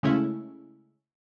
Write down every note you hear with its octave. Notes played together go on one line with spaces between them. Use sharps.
C#3 G#3 A3 C#4 E4